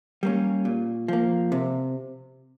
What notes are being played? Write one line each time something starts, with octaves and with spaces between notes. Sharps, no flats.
G3 A#3 C#4
A#2
F3 A#3
C3